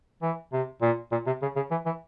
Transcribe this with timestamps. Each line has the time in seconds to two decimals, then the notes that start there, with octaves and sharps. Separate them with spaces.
0.22 E3
0.53 C3
0.82 A#2
1.12 A#2
1.27 C3
1.42 C#3
1.56 C#3
1.71 E3
1.86 E3